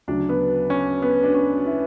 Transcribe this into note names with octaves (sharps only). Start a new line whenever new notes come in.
D2 C#3 F#3 D4
B3
C#4
B3
D4
C#4
E4